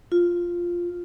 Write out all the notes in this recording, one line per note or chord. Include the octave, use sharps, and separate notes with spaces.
F4